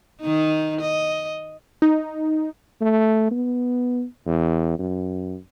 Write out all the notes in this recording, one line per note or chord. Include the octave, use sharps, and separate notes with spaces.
D#3 D#4
D#5
D#4
A3
B3
E2
F#2